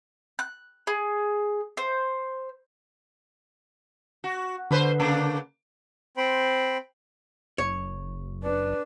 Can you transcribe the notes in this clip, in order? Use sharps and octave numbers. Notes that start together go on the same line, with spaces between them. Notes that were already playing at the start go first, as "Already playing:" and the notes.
F#6
G#4
C5
F#4
B2 D3 B4 C5
C#3 A#3 D4
C4 C5 G5 B5
F#1 C#5
D4 B4